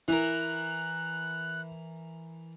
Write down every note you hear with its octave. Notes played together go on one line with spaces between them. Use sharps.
E3 E4 A#4 F#6